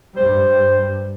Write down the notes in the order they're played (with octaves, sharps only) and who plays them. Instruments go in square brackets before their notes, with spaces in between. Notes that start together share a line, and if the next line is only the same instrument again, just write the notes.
[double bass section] G2 G3 [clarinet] C5